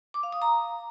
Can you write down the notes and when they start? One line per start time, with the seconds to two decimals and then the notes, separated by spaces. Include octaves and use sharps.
0.14 D6
0.23 F5
0.32 D#6
0.42 A#5